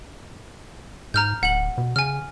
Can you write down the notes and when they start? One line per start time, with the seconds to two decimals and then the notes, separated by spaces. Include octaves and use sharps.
1.14 G#2 A#5 F6 G6
1.43 D1 F#5 F#7
1.78 B2
1.96 C#3 G#5 F6